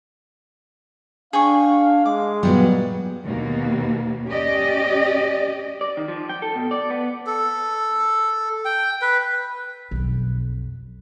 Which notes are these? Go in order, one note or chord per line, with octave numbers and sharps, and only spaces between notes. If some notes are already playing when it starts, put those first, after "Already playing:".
D4 G#4 F5 G5 C#6
G#3 D6
A#2 F#3 G3 B3
D#2 B2 A#3
C#4 G4 D5 D#5
D5
D#3
F3
G5
A4
B2
D5
B3
A4
G5
B4
B1 F2